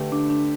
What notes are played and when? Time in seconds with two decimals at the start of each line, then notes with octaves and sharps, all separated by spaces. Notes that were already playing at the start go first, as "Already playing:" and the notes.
Already playing: D3 A3 G4 B4
0.12 D4
0.30 D4